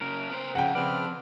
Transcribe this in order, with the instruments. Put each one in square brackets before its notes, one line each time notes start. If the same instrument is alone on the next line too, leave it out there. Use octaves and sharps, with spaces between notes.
[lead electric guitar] F#2 C#3 [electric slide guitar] A#4
[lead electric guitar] B3 C5
[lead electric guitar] F2 [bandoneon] C#3 [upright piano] F#5 G5
[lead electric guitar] F2 [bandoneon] C#3 B4 F6 [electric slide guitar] C4 D5